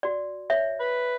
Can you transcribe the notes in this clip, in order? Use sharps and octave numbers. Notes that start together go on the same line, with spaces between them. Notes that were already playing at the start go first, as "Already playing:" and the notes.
F#4 D5
C#5 E5
B4